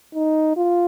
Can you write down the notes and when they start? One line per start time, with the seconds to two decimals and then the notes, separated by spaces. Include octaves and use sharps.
0.15 D#4
0.57 F4